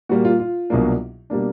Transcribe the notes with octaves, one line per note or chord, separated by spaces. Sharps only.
A#2 G3 A#3 F#4
F4
F4
C2 B2 F#3 A#3 D4
B2 G3 A#3 D4